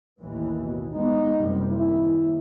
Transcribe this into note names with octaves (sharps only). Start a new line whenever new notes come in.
A1 D#2 E3
B2
G#3 B3 D#4
F#1 C3 G3
D#2 E4